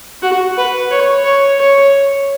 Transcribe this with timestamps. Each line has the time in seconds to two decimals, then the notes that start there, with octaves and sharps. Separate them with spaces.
0.22 F#4
0.57 B4
0.91 C#5
1.24 C#5
1.59 C#5